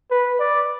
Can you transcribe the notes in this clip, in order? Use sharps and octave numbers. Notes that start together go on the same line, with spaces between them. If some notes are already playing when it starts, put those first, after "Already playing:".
B4
D5